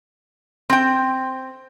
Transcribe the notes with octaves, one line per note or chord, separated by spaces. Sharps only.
C4 G5